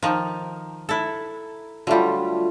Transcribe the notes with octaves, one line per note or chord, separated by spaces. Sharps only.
D#3 F3 A#5
E4 A4
D3 F#3 G3 A3 F4